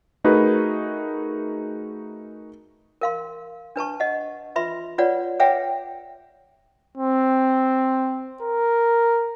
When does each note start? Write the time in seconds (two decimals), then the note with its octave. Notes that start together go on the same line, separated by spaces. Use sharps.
0.24 A3 D#4 F#4 G#4 A#4 B4
3.01 A#4 F5 C6
3.76 D4 B4 A5 C#6
4.00 D#5 F#5
4.56 F4 B4 E5 B5 C6
4.98 F4 B4 C#5 D5 F#5
5.40 G#4 B4 C#5 E5 F#5 G5
6.97 C4
8.42 A#4